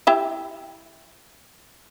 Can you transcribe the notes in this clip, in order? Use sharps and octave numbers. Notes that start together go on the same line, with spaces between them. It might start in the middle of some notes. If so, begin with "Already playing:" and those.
E4 G4 E5